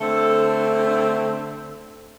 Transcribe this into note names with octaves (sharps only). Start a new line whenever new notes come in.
D3 A3 C4 A4